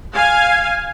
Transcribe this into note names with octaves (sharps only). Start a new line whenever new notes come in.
F5 G#5